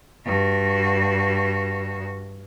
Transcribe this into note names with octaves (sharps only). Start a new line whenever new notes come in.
G2 F#4